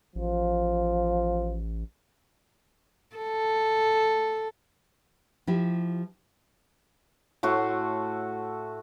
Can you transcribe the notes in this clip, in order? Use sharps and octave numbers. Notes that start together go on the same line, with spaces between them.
A1 F3
A4
F3 E4 G4
A2 A3 F#4 C6